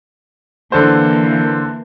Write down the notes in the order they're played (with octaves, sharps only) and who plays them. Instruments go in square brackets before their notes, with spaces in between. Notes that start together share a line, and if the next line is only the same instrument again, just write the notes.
[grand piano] D3 A4 C5 [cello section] E3 A#3